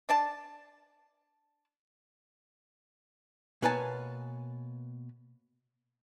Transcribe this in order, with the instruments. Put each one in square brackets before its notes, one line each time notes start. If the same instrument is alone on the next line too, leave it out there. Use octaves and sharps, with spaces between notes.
[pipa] D4 D5 A5
[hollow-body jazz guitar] B2 A#3 B4 C#5 G#5 A5